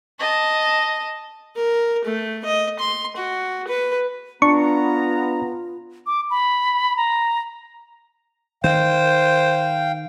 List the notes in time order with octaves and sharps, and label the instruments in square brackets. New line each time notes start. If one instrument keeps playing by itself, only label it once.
[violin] D#5 A5
[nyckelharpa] A#4
A3
D#5
C6
F#4
B4
[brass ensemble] B3 A#5 [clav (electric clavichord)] D4 [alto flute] F4 [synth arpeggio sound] C#6
[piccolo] D6
B5
A#5
[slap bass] D#3 [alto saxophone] C5 [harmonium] F5 G5